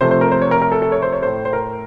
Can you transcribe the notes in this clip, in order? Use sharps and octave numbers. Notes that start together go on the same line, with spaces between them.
C3 F3 A3 C5
C5
A#4
C5
C#5
A#4
A#4
A4
A4
C#5
C5
C#5
A2 A3 C5
C5
A#4